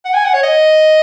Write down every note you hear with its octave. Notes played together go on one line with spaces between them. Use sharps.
F#5
G#5
F#5
C#5
D#5